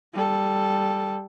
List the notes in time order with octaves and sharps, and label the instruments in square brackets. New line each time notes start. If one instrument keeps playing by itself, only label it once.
[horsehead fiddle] G3 A4